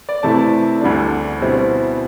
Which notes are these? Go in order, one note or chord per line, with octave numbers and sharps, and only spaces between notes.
D5
C3 E3 A3 E4 A5
D2 D3 G3 D4
B2 G3 C4 E4